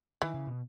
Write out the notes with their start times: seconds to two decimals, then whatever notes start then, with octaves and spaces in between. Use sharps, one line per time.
0.22 D#3 E3
0.35 C#3
0.47 B2